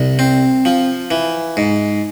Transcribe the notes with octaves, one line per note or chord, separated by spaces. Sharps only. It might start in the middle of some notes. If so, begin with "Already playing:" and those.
Already playing: C2
C4
F3
E3
G#2